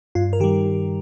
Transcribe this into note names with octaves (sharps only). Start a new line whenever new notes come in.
G2 F4
A#4
D#3 G3 G4